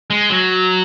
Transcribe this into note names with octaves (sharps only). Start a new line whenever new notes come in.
G#3
F#3